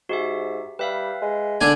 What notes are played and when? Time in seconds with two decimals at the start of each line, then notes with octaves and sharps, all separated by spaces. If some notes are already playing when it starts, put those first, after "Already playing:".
0.09 G#2 F#4 G4 E5
0.79 G3 B4 E5 F5
1.22 G#3
1.61 D3 D4 G#5